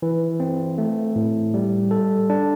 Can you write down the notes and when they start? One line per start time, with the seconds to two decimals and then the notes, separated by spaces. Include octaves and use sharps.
0.02 E3
0.40 C4
0.78 A3
1.16 A2
1.54 G3
1.91 A4
2.30 D4